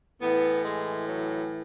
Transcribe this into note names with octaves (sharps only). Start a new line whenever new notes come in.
A2 E3 B3
G#3
F#3